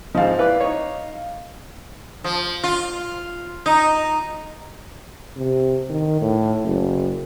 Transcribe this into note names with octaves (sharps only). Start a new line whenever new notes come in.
G#2 F3 D#5 F5
E4 B4 D5
D#4 C#5
F3
F4
D#4
C3
D#3
A2
F#1